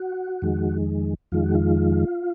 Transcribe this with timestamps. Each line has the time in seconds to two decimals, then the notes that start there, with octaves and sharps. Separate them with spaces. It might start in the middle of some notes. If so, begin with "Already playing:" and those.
Already playing: F#4
0.42 F2 D#3 G#3
1.32 F2 D#3 G#3 F4
1.43 F#4
1.55 F4